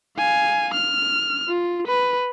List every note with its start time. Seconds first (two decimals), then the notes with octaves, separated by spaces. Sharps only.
0.18 F5 G#5
0.74 F6
1.48 F4
1.87 B4